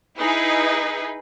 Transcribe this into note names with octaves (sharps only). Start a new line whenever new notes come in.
D#4 E4 G#4 B4